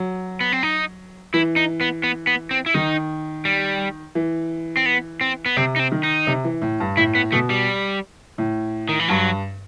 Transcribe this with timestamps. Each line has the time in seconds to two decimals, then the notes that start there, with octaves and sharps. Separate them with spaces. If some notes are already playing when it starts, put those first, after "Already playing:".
Already playing: F#3
0.41 B3
0.52 C4
0.63 D#4
1.34 E3 E4
1.56 D#4
1.81 B3
2.03 B3
2.27 B3
2.51 C4
2.66 E4
2.74 D#3 D#4
3.45 G3
4.15 E3
4.77 C4
4.86 B3
5.21 C4
5.46 B3
5.57 C3 C4
5.76 D#4
5.79 C4
5.92 D#3
6.03 D#4
6.27 C3
6.44 E3
6.62 A2
6.80 G2
6.97 A2 E4
7.15 B3
7.32 B2 A3
7.50 G3
8.38 A2
8.89 D#3
8.99 E3
9.08 G2 F#3